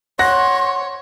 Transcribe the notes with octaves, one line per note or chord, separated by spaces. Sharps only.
C#5 F#5 C6 A#6